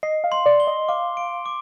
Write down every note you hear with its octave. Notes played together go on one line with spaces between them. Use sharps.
D#5 C7
F5
C6
D5
G7
D#5
F5 D6
D7
D6